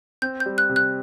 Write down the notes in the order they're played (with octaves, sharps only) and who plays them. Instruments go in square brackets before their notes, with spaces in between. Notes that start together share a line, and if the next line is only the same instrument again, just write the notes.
[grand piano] C4 [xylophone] G6
[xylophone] G6
[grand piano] G3
[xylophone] F#6
[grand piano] C3
[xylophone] F#6